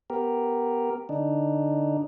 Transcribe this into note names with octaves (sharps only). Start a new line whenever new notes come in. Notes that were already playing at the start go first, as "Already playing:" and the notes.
B3 G4 A#4
D3 D4 D#4